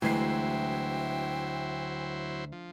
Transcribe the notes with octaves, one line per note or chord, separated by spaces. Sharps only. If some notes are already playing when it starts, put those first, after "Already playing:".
D2 E3 F#3 G#3 E4 C5 G5 C7
F3